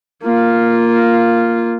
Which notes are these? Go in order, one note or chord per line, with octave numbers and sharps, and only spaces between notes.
A#3 F4